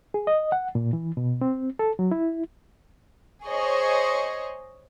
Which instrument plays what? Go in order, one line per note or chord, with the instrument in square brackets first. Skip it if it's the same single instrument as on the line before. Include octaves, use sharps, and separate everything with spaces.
[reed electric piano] G#4
D#5
F#5
A#2
E3
B2
C4
A4
F#3
E4
[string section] G#4 C5 C#5 D#5